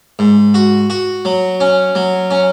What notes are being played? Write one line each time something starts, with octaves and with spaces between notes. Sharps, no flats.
G#2
F#4
F#4
F#3
C#4
F#3
C#4